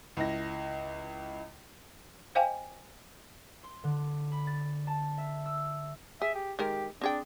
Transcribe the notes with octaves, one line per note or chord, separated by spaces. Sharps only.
C#2 E4 A#6
C5 D#5 F5 G5 G#5
C6
D3
B5
A6
A5
E5
E6
G#4 E5
G4
D#3 G#3 G4 A#4
C4 D4 G#4 G5